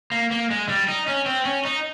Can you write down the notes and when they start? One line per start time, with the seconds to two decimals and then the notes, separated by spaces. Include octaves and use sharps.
0.12 A#3
0.31 A#3
0.51 G#3
0.69 G3
0.88 D#4
1.08 C#4
1.26 C4
1.45 C#4
1.65 D#4